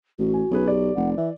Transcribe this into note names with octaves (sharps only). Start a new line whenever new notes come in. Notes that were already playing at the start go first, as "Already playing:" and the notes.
A1 F#4
G#5
B1 C#4 G#4 B4
G4 D5
F1 F#5
E3 E5